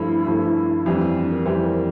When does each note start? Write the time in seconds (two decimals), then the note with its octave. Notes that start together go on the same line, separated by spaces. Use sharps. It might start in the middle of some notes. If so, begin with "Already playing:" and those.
Already playing: G2 F3 A3 E4
0.27 G2 F3 A3
0.86 F2 E3 G3 D4
1.01 C4
1.16 D4
1.31 A#4
1.45 F2 E3 G3 C5
1.65 A#4